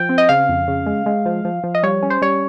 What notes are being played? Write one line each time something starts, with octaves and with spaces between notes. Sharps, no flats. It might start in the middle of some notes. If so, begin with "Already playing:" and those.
Already playing: F3 G5
C4
D#5
C#3 F5
F2
C#3
G#3
G#3
F3
F3
F3
D#5
G3 C#5
C#4
C5
G3 C#5